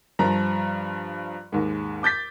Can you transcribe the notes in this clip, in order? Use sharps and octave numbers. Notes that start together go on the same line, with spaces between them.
G2 F3 A#5
D#2 G#2
D6 G6 A6 B6